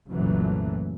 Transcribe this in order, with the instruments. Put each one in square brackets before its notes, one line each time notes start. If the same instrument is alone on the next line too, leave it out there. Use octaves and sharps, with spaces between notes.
[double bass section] F#1 C2 F#2 A#2 E3 A3